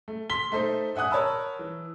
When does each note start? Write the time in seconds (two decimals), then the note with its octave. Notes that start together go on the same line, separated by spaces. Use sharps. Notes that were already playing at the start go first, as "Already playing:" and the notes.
0.08 A3
0.30 C6 B6 G7
0.52 A3 D#4 A4 C5
0.95 E5 F#5 G#5 D#6 F#6
1.11 A#4 C#5 A5 B5 E6
1.59 E3